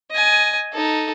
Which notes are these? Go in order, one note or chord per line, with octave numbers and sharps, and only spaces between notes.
D#5 G#5
D#4 A4